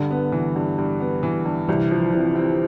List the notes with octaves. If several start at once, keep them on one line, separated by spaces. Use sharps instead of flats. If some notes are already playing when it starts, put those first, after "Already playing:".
Already playing: G2 D3
B3
E3
G2
G2
B3
E3
G2
C2 E3
F3
C3 E3
C4